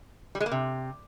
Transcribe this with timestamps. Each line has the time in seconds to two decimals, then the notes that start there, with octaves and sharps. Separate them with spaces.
0.35 G3
0.40 G#3
0.46 A#3
0.51 C3